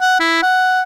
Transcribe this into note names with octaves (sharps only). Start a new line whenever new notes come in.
F#5
E4
F#5